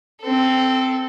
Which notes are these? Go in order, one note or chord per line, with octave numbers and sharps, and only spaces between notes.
C4 A4